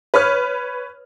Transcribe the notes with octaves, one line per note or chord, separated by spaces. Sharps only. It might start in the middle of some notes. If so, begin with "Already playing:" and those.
B4 C#5 F6